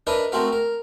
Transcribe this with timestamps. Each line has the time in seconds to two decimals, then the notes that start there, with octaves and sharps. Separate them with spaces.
0.07 D4 A#4 B4 D#5 E5
0.32 A3 C4 F#4 A#4
0.53 A#4